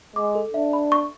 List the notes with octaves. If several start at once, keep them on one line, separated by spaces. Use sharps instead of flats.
G#3 D6
A4
D4 E5
B5
C#6